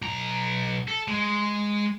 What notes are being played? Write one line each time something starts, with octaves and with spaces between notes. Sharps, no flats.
B1 A#5
A4
G#3